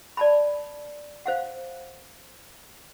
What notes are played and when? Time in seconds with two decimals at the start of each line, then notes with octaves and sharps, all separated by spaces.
0.17 D5 A5 B5
1.26 C5 F5 F#5